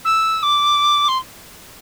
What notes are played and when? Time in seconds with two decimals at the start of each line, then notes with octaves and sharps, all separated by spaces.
0.05 E6
0.42 D6
1.08 C6